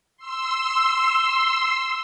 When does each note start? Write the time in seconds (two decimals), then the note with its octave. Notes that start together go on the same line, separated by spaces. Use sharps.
0.17 C6 E6